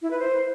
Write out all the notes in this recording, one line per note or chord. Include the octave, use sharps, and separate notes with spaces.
E4
B4
C5